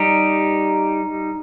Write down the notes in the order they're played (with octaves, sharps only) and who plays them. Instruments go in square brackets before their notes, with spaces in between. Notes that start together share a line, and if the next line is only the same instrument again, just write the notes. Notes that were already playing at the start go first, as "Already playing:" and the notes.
Already playing: [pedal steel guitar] G3 D#4 G4